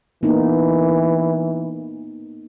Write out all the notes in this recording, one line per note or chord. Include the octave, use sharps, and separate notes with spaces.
E3 A#3 B3 D#4